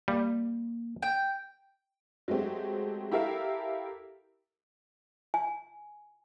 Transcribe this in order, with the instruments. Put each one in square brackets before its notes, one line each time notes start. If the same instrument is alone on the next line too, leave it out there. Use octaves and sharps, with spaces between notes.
[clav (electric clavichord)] G3 [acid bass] A#3
[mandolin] G5
[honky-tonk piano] F#3 G#3 A3 C4 G4
E4 G4 A4 A#4 E5 F5
[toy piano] G#5